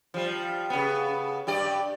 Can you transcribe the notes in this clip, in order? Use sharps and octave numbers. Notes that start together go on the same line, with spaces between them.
F3 G3
C#3 B3
G2 G4 D5